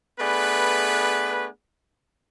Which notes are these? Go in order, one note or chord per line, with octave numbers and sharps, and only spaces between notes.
A3 B3 D4 G#4 B4